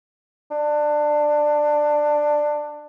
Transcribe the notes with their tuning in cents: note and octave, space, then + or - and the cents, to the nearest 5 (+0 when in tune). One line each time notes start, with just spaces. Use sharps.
D4 +15